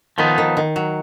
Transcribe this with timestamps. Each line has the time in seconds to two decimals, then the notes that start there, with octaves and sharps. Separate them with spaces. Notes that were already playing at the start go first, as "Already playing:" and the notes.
0.18 D#3 F3 B3 D#4
0.38 D#3
0.57 D#3
0.76 F#3